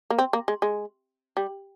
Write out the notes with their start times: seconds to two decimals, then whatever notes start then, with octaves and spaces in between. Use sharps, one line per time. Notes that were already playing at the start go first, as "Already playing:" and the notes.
0.10 A#3
0.19 C4
0.33 A#3
0.48 G#3
0.62 G#3
1.37 G3